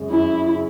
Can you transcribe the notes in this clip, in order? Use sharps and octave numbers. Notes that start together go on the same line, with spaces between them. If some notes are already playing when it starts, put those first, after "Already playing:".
Already playing: F#2 C#3 G#3
F#2 E4
C#3